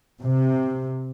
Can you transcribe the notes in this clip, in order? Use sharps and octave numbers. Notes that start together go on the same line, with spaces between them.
C3